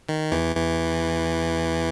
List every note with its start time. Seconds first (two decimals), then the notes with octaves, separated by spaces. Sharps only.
0.09 D#3
0.32 E2 E3
0.55 E2 E3